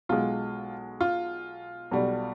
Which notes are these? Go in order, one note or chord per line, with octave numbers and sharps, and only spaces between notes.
B1 B2 G#3 F4
F4
B1 B2 G3